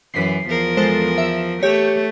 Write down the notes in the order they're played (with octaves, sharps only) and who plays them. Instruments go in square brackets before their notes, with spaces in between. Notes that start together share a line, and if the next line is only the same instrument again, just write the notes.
[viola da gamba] F#2 E3 [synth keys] B6 C7
[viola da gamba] E2 F3 A#4
[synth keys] G#3 A4 C5
E5
[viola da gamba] A3 [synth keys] G4 C#5